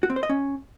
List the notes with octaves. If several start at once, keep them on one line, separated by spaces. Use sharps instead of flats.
F#4
C4
C5
D#5
C#4